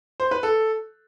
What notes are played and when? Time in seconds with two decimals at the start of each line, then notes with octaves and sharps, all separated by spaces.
0.20 C5
0.31 B4
0.43 A4